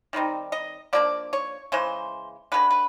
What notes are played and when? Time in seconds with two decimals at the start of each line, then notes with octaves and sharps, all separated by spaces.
0.13 D#3 G3 C4 D#4
0.52 D#5
0.93 F3 A#3 D4 D5
1.33 C#5
1.72 C#3 E3 G#3 C5
2.52 D3 F3 G#3 B4
2.71 B4